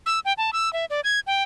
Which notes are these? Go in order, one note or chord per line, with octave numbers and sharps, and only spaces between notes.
E6
G5
A5
E6
E5
D5
G#6
G5